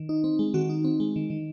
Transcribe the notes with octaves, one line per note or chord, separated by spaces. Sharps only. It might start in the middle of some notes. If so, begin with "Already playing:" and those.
Already playing: D#3
D#4
C4
G#3
D#3 F#4
D#4
C4
G#3
D#3
D#3